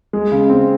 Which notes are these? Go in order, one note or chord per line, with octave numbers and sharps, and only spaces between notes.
G#3
C#3
C4